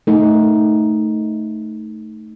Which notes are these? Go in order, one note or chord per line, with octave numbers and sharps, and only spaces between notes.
A3 D#4